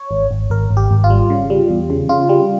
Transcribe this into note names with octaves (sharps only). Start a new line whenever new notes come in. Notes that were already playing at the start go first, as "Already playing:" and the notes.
Already playing: C#5
G#1
G#1
G#1 A#4
G#1
G4
G#1
F4
G3
C#3
G3
E2
C#3
C#3 F4
G3